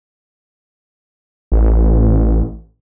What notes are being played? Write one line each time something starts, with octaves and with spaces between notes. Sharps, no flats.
A1